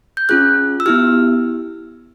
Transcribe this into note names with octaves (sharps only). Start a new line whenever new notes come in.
G6
C#4 F4 G#4 F#6
E6
B3 E4 G4 F6